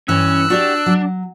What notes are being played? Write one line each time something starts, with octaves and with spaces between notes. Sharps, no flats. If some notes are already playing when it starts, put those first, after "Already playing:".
G2 E3 C#4 E6 F#6
D4 F#4 G4 D5
F#3